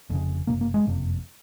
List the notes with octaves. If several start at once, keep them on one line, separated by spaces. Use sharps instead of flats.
F1 F2 C#3
F#1 F2 C3 A#3
A#3
G#3
F#1 F2 C3